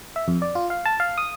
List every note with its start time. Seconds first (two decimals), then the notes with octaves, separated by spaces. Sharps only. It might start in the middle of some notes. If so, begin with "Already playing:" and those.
0.16 E5
0.28 F2
0.42 D5
0.55 F4
0.70 F5
0.85 A5
1.00 F5
1.18 D#6